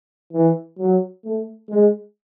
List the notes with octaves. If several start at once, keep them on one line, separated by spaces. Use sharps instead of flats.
E3
F#3
A3
G#3